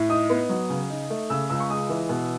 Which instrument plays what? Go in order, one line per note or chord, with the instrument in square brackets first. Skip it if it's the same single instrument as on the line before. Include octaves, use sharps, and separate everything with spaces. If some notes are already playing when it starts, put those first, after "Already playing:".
Already playing: [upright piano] A2
D#4 D#6
B3
F#3
C#3
D#4
A3
C#3 E6
C#2 E6
C#6
G#3 D#6
E3
B2